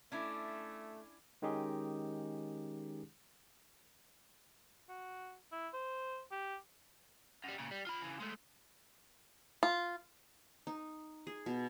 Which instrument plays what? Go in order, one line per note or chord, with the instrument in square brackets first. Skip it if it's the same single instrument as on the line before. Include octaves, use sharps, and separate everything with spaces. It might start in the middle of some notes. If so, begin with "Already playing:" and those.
[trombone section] A3 [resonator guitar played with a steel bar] C#4 D4 E4
[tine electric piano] D#3 G#3 C#4 D#4 G4 G#4
[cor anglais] F#4
E4
C5
G4
[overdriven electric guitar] F#2 G3
A#2 C#3
G3
F4 B5
C#3 E3
G#3 A3
[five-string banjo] F4
[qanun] D#4
G#4
B2